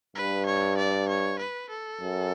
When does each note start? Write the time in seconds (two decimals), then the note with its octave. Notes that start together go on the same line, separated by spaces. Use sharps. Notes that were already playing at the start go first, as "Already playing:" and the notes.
0.15 G2 B4
0.46 C#5
0.78 D5
1.09 C#5
1.39 B4
1.70 A4
2.01 F#2